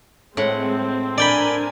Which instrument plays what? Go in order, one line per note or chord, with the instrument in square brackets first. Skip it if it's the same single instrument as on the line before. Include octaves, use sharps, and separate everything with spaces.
[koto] A2 F#5 [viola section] G#3 [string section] C4
[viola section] D4 A#4 G#5 [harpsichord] D5 G5 B5